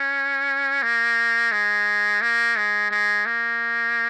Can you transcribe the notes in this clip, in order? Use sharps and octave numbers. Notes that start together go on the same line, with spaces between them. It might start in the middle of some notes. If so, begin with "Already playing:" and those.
Already playing: C#4
A#3
G#3
A#3
G#3
G#3
A#3